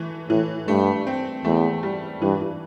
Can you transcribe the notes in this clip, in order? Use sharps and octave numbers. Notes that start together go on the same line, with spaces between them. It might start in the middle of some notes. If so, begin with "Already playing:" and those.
Already playing: E3 A3
A2 E3
G2 A3
C4
E2 A3
G3
G2 E3
E3